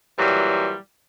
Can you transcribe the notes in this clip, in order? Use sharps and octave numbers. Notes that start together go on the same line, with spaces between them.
A#2 E3 F#3 G3